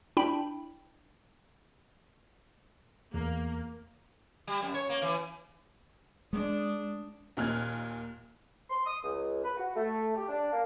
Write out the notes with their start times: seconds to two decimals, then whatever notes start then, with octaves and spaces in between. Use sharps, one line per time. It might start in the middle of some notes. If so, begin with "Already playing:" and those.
0.17 D4 E4 G5 B5
3.14 E2 A#3
4.47 G3
4.62 F#2
4.74 C#5
4.90 A#3
5.02 E3
6.33 G#3 D4 D#6
7.37 D#2 A#2 F6 F#6 G#6
8.70 C6
8.86 D#6
9.03 C#2
9.44 B4
9.57 F#4
9.75 A3
10.15 G4
10.28 D4
10.52 A#3